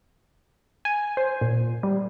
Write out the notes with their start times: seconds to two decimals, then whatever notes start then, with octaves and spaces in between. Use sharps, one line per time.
0.85 G#5
1.17 C5
1.41 A#2
1.83 G3